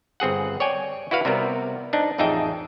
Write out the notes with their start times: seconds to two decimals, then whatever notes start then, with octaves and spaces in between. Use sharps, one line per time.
0.20 G1 C4 G#4 F#5
0.60 C#5 D5 G5 G#5
1.11 E4 F#4 B4 F5
1.25 C3 G3 B3 A#4
1.93 C4 D4 D#4
2.18 A1 F2 D#4 G#4 E5 G5